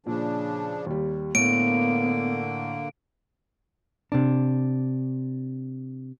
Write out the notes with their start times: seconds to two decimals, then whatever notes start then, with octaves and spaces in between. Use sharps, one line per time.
0.06 A#2 C#3 F3 D4
0.86 D#2 G3
1.35 A2 D3 A#3 B3 D7
4.12 C3 D4